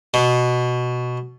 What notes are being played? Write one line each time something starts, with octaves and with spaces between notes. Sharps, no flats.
B2